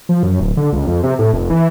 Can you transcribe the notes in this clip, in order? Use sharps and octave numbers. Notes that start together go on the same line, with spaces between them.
F3
F#2
D1
D3
C#2
F2
C3
A2
F1
E3